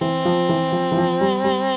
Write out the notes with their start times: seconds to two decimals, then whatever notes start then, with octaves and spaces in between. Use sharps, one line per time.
0.01 E3 C4
0.25 F3
0.49 E3
0.72 F3
0.92 E3
0.97 F3
1.21 G3
1.44 G3